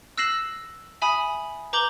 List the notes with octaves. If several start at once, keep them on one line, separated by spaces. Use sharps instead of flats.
E6 F#6 A#6 C7 E7 F#7
E5 G#5 B5 D#6
B4 A#5 D6 G6 F#7 G7